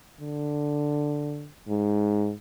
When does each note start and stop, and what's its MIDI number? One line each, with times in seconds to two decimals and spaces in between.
0.20 1.49 50
1.69 2.33 44